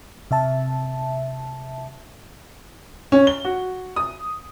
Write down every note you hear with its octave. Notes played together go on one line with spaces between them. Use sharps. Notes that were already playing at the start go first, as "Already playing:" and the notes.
C3 E5 A5
C#4
G7
F#4
D#6